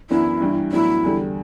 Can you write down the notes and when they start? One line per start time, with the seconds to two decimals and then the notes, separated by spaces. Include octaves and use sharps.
0.10 F#2 E3 B3 D4 E4
0.41 G2 E3 G3 D4
0.72 A2 F#3 B3 D4 E4
1.04 E2 D3 G3